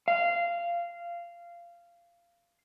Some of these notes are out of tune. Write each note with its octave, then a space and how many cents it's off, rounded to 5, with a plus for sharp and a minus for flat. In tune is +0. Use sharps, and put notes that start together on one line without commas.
F5 -15